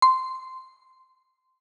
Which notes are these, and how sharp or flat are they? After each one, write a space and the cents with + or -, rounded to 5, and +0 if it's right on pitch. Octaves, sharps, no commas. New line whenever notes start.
C6 -10